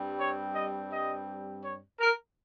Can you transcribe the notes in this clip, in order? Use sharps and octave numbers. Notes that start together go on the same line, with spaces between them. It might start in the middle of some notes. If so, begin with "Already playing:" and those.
Already playing: G2 G3 C4
C#5
D#5
D#5
C#5
A#4